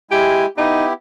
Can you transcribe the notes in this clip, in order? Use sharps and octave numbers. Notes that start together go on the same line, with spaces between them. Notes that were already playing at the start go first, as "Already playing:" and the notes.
G#3 E4 G4 G#5
B3 D#4 E4 G4